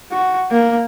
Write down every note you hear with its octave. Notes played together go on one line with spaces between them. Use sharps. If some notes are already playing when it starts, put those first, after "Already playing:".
F#4
A#3